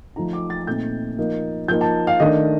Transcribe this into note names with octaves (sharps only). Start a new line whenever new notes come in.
F3 A3 D#4 A#5
D6
A6
A#2 A3 C4 D#4 G6
F3 A#3 D#4
F3 A#3 D#4 G6
A5
F5
D#3 A3 D4 D#5